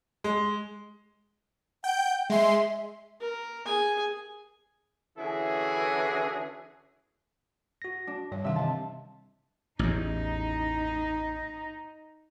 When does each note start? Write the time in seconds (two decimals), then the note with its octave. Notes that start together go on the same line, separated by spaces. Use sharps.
0.24 G#3
1.84 F#5 G5 G6
2.30 G#3 E5 C6
3.21 A#4
3.66 G#4 G#5
5.18 D3 E3 C#4 E4 F#4 G#4
7.82 F#4 A#6
8.07 D4
8.32 G2 G3 C#5
8.44 C3 D#3 E3 G3 E5 F5 C6
8.56 C4 D#5 A5
9.79 A1 E2 D#4